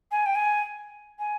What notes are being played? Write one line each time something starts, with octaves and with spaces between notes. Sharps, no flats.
G#5
G5
G#5
G#5